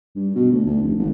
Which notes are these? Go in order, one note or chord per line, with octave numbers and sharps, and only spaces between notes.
G2
B2
D2
D2
F1
G#1